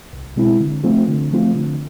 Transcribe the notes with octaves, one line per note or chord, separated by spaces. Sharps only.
C2
B2 G#3 C4 E4
D3
F3 A3 C4 F4
D3
F3 A3 C4 F4
D3